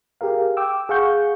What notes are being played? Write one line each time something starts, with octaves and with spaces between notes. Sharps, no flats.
G4 G#4 A#4 F5
G5 D6 E6
G#4 F5 F#5 C#6 G6